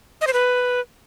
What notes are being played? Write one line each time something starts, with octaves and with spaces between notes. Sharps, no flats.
D#5
C5
B4